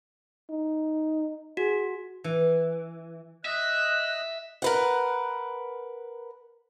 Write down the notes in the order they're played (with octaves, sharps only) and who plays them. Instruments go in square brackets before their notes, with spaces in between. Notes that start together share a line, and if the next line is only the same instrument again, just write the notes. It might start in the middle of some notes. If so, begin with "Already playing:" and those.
[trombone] D#4
[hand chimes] F#4 [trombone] G#4
[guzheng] E3
[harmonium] D#5 [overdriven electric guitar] E5 [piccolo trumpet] F#6
[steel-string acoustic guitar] A#4 B4 F#5